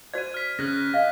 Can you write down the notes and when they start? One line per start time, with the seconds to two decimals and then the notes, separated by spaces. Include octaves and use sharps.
0.14 F#4 C5 D5 G#6 D#7
0.34 F6 B6
0.59 C#4 G#4 F#6 A#6
0.94 D#5 F5